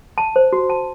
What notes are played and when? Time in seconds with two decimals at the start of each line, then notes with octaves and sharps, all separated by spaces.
0.18 A5
0.36 C5
0.53 F#4
0.70 A5